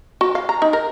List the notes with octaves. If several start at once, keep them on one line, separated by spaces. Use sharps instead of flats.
F#4
F5
A#5
D#4
A#4